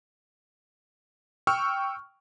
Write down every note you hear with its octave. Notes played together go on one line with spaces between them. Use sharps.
G5 C#6 E6 F6